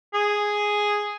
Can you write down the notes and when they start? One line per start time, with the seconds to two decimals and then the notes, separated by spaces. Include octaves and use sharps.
0.14 G#4